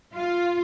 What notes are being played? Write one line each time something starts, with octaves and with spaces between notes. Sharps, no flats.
F4